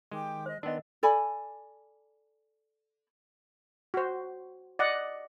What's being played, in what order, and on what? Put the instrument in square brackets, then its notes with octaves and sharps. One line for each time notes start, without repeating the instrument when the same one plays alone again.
[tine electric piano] D#3 C6 [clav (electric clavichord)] G#3 [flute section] G4 G5 D6
[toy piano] C5 [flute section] D#5
[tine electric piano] D#3 [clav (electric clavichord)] B3 D4 [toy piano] A#4 D#5 [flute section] G5 C6
[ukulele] A4 D5 G#5 B5
[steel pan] F#4 C5
D5 D#5 F#5